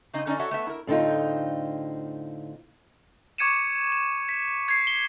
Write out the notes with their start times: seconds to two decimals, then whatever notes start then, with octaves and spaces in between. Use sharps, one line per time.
0.13 C#3 C4 D#4 D#5
0.26 D3 C#4 D#4 C5 D5 D#5
0.39 F#4 A4 C#5 D5 E5 F#5
0.51 A3 B3 E5
0.67 E4 A#4
0.87 A2 D3 C4 D#4 F4
3.38 C#6 D6 G#6 C#7 D#7 E7
3.92 E7
4.29 B6
4.68 G#6 C7
4.87 G7